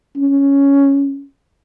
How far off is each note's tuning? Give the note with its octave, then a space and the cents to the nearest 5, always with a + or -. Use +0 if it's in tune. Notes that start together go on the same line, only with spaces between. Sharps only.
C#4 +5